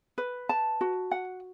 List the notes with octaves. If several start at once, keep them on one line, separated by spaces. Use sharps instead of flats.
B4
A5
F#4
F#5